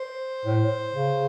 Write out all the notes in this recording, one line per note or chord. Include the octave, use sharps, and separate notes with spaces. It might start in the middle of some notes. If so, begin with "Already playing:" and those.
Already playing: C5
A2
C#3